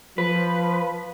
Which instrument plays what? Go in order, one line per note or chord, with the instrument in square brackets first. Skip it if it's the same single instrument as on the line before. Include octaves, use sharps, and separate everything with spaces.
[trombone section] F3 [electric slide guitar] B4